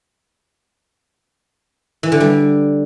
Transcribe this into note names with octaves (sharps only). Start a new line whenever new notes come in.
E3
D3
G3